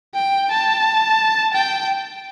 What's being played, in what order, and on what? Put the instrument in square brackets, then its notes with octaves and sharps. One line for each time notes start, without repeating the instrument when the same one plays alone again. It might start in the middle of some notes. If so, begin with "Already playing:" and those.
[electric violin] G5
A5
G5